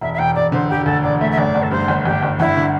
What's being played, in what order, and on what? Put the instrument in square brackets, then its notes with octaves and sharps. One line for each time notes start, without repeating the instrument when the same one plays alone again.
[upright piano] E1 [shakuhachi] E5
[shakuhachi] E5
[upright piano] E1 [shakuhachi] G5
[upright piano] E1 [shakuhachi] D5
[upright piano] D3 [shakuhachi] C5
[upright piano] E1 [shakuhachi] G4
[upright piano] D2 [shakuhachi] A4
[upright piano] E1 [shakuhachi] D5
[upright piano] A3 [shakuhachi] E5
[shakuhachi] E5
[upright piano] G1 [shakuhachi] D5
[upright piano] G1
[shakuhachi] A4
[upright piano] G2 [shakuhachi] C5
[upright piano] G1
[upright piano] G1 [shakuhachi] G4
[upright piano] G1
[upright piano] G1 [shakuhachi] E4
[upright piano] D3